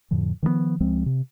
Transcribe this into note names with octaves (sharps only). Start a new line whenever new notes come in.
F2 A2 D3 F3
D#3 F3 G3 B3
C#2 F3 G#3 C4
C3